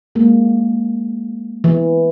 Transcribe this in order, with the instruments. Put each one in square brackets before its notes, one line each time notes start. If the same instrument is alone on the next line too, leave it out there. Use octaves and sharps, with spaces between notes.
[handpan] G#3 A#3
E3